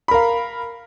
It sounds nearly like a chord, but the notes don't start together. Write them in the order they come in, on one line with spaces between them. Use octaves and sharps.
B5 A#4 F5